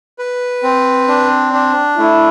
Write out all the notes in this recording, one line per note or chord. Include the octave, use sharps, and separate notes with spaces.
B4
C4
D4
D4
A3 E4